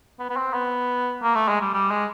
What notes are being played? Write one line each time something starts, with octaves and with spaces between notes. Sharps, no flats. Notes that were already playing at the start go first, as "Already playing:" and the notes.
B3
B3
C4
B3
A#3
A3
G#3
G3
G3
G#3